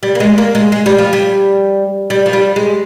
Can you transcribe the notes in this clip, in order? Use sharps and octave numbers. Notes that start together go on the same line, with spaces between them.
G3
A#3
G#3
A#3
G#3
G#3
G3
F3
G3
G3
F3
G3
G#3